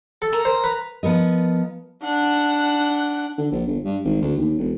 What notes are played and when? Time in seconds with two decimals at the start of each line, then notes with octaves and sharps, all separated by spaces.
0.22 A4
0.33 A#4 A#5
0.45 A#4 C5
0.64 B4
1.03 F3 B3 A#4 D#5
2.03 D4 F#5
3.38 D3
3.51 A#1
3.67 G1
3.85 G2
4.05 G#1
4.21 D2
4.37 D#2
4.58 E1